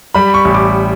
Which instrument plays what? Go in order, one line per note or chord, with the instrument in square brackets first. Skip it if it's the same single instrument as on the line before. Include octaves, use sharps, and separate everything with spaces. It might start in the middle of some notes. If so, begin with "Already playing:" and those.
[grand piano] G3 B5
C#6
A1
D6